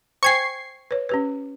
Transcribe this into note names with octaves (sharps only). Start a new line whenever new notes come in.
C5 G5 G#5 C#6 G#6 C7
B4 C#5
C#4 G4 B4